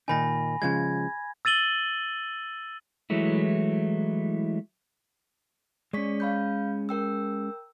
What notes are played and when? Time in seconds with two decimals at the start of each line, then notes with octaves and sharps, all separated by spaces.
0.08 A#2 D#3 D#4 G#5 B5 A#6
0.62 C#3 F3 G#3 G#6
1.45 E6 A6 D#7 F#7 G7
3.10 E3 F#3 G#3 A3 E4
5.93 G#3 C#4 D5 C#6 B6
6.20 F5 B5 G6
6.89 A#4 G5 E6